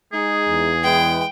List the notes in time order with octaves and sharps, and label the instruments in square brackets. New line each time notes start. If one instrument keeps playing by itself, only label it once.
[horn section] G#3 D#4 [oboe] G#4
[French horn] E2
[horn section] E3 G#3 B4 [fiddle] G5